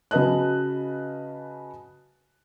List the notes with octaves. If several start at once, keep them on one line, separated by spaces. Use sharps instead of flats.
C#3 F#4 B4 D#5 A5 F#6